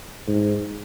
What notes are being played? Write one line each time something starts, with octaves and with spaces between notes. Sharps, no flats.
G#2